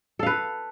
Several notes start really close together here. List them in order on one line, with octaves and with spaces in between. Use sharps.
A4 F5 B4